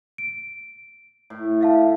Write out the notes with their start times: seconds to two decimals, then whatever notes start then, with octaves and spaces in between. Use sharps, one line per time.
0.18 D7
1.30 A2
1.61 E5 F5 A5